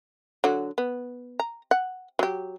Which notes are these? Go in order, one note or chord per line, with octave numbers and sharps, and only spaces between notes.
D3 F#3 F#4
B3
A#5
F#5
F#3 G4